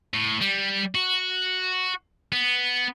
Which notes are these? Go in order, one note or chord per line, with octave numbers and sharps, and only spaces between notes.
A2
G3
F#4
B3